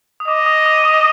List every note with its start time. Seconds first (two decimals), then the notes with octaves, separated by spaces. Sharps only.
0.20 D#6
0.28 D#5 D6
0.46 D#6
0.66 D#6
0.84 D6